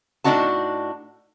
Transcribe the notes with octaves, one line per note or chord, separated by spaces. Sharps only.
A2 C4 D4 D#4 F#4 A5